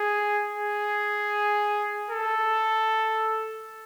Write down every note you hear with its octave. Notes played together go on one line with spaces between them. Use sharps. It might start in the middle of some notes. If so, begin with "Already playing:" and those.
Already playing: G#4
G#4
A4